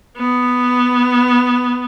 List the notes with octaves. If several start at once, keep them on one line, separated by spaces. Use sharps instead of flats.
B3